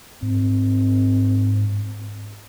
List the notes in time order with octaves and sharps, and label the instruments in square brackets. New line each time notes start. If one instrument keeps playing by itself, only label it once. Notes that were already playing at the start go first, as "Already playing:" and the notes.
[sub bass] G#2 [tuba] C4